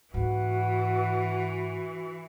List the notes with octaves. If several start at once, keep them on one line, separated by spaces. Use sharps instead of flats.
G#2 D3 E3 F#4 B4 F#5